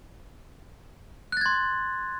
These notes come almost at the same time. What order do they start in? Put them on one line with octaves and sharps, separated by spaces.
F#6 A6 G#6 C6